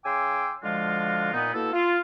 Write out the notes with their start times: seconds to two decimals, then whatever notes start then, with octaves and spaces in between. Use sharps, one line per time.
0.05 C#3 G5 G#5 C6 D6 E6
0.63 D3 F3 G#3 F4 F#4 F5
1.34 A#2 B3 D#4
1.54 B2 A#3 E4 A4
1.74 F4